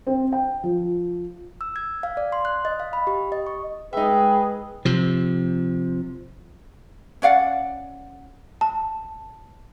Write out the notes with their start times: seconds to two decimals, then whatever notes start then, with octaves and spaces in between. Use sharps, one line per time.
0.07 C4
0.32 G5
0.63 F3
1.61 E6
1.76 G#6
2.03 F5
2.17 D5
2.32 C6
2.45 F#6
2.65 D#5
2.80 F5
2.93 B5
3.07 G4
3.32 D#5
3.47 C#6
3.93 G#3 D#4 G#4 B4 E5 G5
4.85 C3 F3
7.22 C#4 D5 F5 F#5
8.61 A5